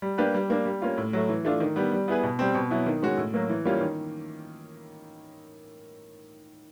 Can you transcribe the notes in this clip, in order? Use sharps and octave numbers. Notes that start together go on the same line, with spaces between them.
G3
A#3 D4 G4 B4
G3
A#3 D4
G3
A#3 C#4 F4
A2
F#3 A3
E3
A3 D4 F4
D#3
G3 B3
G3
B3 E4 G#4 B4
B2
G3 C4
B2
F#3 B3 E4
D#3
G#3 C#4 F#4
A2
F#3 A#3
E3
G3 A#3 C#4 F4
D#3